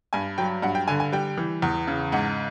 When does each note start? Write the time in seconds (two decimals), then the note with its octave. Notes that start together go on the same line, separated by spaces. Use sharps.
0.13 G2 G#5
0.38 F#3 G5
0.62 G2 F#5
0.75 G5
0.88 D3 G#5
1.00 G#5
1.13 G3 G5
1.38 E3
1.62 E2
1.87 C#3
2.12 G#2 F#5